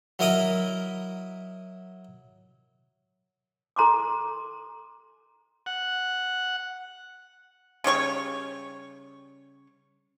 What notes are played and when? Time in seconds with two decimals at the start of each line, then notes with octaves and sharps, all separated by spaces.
0.19 F#3 E4 A#4 D#5 B5 D#6
3.76 A4 A#5 C6 D6
5.66 F#5
7.84 C#3 G3 C#5 C#6